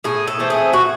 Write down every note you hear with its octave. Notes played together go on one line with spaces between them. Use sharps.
A2 G#4
A4
E3 A3 C4
G#4
A2 F#4